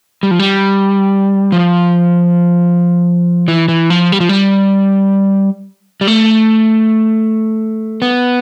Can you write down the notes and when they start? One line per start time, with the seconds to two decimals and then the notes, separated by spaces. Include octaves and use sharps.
0.23 G3
0.31 F3
0.39 G3
1.52 F3
3.48 E3
3.68 E3
3.90 F3
4.12 G3
4.20 F3
4.29 G3
6.01 G3
6.07 A3
8.02 B3